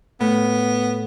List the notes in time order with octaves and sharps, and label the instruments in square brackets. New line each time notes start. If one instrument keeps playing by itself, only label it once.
[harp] A2 [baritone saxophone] B3